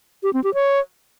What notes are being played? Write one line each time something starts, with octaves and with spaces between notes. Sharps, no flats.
G4
C4
G4
C#5